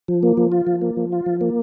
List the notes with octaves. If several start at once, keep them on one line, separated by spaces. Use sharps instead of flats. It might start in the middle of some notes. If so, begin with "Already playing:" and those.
F3
A#3
F3
F4
F3
A#3
F3
F4
F3
A#3